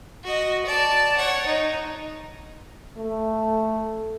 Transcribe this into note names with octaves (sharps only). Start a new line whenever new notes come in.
F#4 D#5
D5 A5
C#5 F#5
D#4
A3